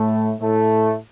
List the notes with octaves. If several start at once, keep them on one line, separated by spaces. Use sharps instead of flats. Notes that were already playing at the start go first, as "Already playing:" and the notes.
Already playing: A2 A3
A2 A3